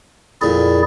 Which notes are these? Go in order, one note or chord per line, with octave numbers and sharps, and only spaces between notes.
F2 A#2 E4 G#4 D5